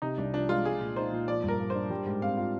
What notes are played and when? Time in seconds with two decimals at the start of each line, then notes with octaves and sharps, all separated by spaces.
0.02 C3 D#4
0.17 C2 D4
0.33 F3 D4
0.49 G#3 F4
0.65 G#3 G#4
0.81 A#2
0.96 D#4 C5
1.12 A#2
1.28 F3 D5
1.44 G2 A#4
1.59 A#3
1.70 C5
1.75 D4
1.90 G3
2.06 G#2
2.22 C4 F5
2.37 F4